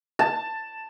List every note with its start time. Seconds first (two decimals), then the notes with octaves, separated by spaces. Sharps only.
0.19 A5